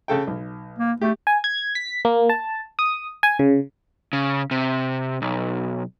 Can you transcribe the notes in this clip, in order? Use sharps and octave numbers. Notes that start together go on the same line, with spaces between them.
C#3 A4 G5
B1
A#3
A3 G4
G#5
G#6
B6
A#3
A5
D#6
G#5
C#3
C#3
C3
B1